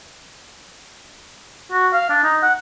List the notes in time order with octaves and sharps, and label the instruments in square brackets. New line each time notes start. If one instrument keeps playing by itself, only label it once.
[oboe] F#4
F5
D4
D#4
F#5